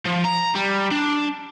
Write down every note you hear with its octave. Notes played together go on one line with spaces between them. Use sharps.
F3
A#5
G3
D4